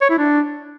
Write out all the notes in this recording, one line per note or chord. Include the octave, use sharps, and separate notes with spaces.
C#5
E4
D4